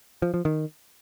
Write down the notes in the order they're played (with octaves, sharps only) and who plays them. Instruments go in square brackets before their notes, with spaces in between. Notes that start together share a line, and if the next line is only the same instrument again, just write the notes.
[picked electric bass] F3
F3
D#3